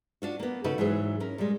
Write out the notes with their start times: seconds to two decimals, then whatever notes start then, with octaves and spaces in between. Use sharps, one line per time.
0.22 D4 F4 F#4
0.39 A#3 B3
0.64 C#3 D#4 F#4 A4 B4
0.78 G#2 E3 F#3 G#4
1.20 C#4 A#4
1.38 A#2 G3 G#3